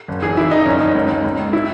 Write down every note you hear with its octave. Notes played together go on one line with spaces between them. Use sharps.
F#1
E3 G#4
E3 E4
E3 D#4
D#4
F#1 C#4
F#1 D#4
C#2
C#2
C#2
C#2
E4